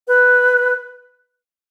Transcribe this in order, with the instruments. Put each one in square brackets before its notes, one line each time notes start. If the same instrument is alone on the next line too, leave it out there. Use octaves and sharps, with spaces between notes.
[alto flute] B4